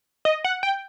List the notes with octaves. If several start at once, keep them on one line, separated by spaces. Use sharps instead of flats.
D#5
F#5
G5